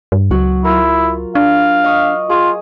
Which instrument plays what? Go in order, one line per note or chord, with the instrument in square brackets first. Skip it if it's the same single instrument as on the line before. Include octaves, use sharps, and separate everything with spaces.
[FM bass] G2
[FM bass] C#2 [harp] F#3 F#4
[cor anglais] E4 [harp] F4 A#4
[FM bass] D4 [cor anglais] F5
[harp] D#5 C#6 D#6
[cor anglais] F4 [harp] G#4